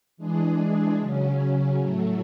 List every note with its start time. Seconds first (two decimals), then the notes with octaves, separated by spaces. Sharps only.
0.17 E3 G#3 D4 G#4
0.98 C#3 F#3 C#4
1.79 A2 F#3 A3